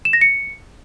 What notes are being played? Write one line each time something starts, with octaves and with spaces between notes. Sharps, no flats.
E7
A#6
C#7